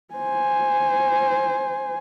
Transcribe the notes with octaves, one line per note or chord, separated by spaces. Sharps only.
C5 G#5